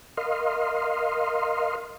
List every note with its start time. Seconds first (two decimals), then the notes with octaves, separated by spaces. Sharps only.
0.17 A#4 D#5 F5 C6